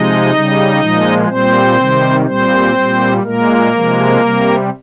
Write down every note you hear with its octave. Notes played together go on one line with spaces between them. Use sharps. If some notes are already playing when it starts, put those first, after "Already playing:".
Already playing: C3 F3 G#3 D#4 D#5
C#3 G3
A#2 F3 G#3
A#2 G3 C4 C5
C3 D#3 G3
A#2 G3 C4 C5
A#2 G3
A#2 G#3 A#3 A#4
C3 F3 G#3
C3 G3